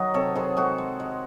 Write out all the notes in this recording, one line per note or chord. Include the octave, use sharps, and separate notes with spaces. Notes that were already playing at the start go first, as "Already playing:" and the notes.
Already playing: D#3 F#3 D#4 F#4 D#5
C3 A4 C#5
D#3 G#4 C5
G#3 F#4 A4
G#3
G#3